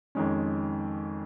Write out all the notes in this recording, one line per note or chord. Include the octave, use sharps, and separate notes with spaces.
F2 D#3 G#3 C#4